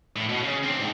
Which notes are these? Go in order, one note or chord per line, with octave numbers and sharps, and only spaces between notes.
A2
B2
C#3
C4 D4
G#2